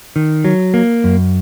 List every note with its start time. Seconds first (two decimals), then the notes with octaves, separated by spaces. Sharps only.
0.16 D#3
0.45 F#3
0.74 A#3
1.04 F#2